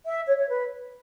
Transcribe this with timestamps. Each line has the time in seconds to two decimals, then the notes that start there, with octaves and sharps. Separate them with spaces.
0.06 E5
0.27 C#5
0.38 C#5
0.48 B4